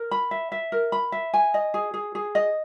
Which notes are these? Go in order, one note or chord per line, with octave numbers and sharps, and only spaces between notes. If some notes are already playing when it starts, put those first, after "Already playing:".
Already playing: A#4
B5
E5
E5
A#4
B5
E5
G#5
D#5
G#4
G#4
G#4
D#5